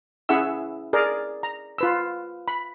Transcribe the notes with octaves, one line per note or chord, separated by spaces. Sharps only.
C#4 E4 G#4 E5 F#5 E6
G#4 A#4 D5
A#5
F4 B4 E6
B5